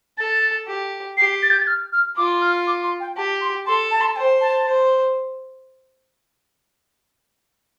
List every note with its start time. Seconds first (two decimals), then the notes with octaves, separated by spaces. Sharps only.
0.18 A4 A6
0.67 G4
1.17 G4 C7
1.43 A6
1.50 G6
1.59 A6
1.67 F6
1.92 F6
2.17 F4 D6
2.41 F6
2.67 D6
2.83 C6
3.00 G5
3.17 G4 A5
3.41 C6
3.67 A4 C6
3.91 A5
4.01 C6
4.08 A5
4.16 C5 G5
4.41 A5
4.65 C5